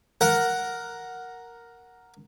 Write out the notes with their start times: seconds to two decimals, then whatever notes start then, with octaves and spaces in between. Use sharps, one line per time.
0.21 A#4 F#5